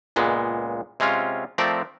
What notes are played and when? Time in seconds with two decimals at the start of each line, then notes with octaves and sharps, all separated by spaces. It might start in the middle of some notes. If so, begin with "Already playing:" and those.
0.16 C#2 A#2 G#3 B3
1.00 C3 G#3 C4 C#4 F4
1.58 F3 A3 C4 A#4 D5